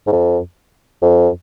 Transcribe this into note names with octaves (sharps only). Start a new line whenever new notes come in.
G#2
F2
F2